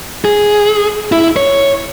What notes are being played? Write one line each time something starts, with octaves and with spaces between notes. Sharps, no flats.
G#4
E4
C#5